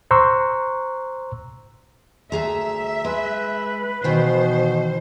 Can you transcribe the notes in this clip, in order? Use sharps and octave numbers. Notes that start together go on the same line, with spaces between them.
C5 A#5 C6 C#6 E6 F#6
D2 G#4 E5 A#5
G#3 B4
B2 D#3 E3 C5